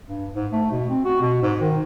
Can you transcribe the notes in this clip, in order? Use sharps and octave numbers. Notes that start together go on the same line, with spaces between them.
G2
G#2
A3
B2
C4
F#4
B2
G#2
D#3